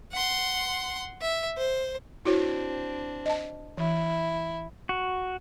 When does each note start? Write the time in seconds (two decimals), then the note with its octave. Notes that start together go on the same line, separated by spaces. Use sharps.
0.12 F#5 C6
1.21 E5
1.57 C5
2.25 C4 D4 E4 F#4 C#5
3.26 D#5 A5
3.77 E3 E4
4.89 F#4